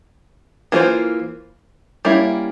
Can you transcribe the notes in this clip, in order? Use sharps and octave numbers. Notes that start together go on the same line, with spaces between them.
E3 A#3 F4 G#4 C5
G3 A#3 C#4 E4